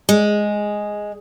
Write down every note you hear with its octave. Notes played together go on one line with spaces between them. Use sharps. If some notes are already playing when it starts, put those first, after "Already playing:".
G#3